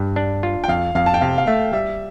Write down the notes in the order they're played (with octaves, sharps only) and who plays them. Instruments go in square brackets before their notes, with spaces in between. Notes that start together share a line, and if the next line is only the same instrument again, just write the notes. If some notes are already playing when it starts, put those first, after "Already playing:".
Already playing: [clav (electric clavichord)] G2
D4
F4
[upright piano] G5
[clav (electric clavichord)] F2 [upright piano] F5
[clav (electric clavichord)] F2 [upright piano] F5
[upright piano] A5
G5
[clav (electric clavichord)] C3 [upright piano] F5
[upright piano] F5
[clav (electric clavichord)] A3 [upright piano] E5
[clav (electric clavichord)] G3 [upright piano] E5